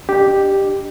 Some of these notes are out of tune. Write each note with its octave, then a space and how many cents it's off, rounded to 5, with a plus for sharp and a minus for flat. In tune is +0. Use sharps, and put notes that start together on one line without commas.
D4 +0 G4 +0 D#5 -35